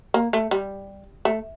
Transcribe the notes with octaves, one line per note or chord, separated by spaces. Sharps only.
A#3
A3
G3
A3